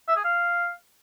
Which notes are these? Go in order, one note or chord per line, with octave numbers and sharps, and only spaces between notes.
E5
G#4
F5